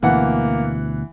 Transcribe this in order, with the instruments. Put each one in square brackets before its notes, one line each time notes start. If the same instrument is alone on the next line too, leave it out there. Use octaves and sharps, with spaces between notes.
[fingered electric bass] D2 B2 [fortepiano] E3 F#5 [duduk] A#3